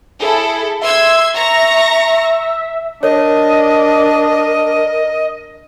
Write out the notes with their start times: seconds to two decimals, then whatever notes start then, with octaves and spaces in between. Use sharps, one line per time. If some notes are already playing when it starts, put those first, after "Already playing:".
0.22 E4 G#4 A4
0.82 E5 C6 E6 G#6
1.37 A#5 C#6 A#6
3.03 D4 A#4 C#5 D#5